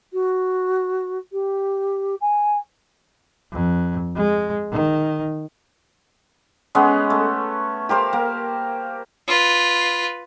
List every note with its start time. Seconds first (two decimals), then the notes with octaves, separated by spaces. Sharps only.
0.13 F#4
1.32 G4
2.21 G#5
3.51 F2
4.15 G#3
4.71 D#3
6.75 G#3 B3 C#4
7.10 A3
7.89 G4 A#4 C5 F5
8.13 A#3
9.28 F4 B4